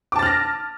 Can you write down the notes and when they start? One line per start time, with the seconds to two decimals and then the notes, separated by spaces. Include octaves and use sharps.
0.12 D6
0.16 A5
0.19 A6
0.23 F6
0.26 A#6